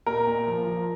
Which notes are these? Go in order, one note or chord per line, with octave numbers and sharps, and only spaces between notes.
A#2 A#4 A#5
A#2
F3
F3